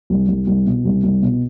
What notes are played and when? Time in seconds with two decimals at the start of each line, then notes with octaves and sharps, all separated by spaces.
0.10 C2
0.28 C2
0.47 C2
0.66 B2
0.85 C2
1.04 C2
1.22 B2